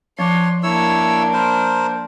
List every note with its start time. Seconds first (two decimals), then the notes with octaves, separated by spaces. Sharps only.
0.19 F3 D4 C#5 C6
0.63 A#3 D4 E4 C#5 E6
1.33 A#4 C5 B5